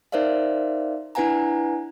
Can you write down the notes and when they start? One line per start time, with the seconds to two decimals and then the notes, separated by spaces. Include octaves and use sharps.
0.12 D#4 A#4 C5 D5 E5 F5
1.15 D4 E4 B4 F#5 G#5 A#5